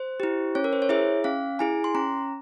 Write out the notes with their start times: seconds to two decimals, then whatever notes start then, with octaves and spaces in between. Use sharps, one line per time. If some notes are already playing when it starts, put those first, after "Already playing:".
Already playing: C5
0.20 E4 G4
0.55 C#4 C#5
0.64 A#4
0.73 C5
0.82 C#5
0.89 E4 G#4 E5
1.24 C#4 F5
1.59 E4 G#4 G#5
1.84 C6
1.95 C#4 A#5